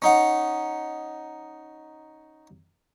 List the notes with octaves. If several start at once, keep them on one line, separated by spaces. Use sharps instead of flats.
C#4 D#4 F#5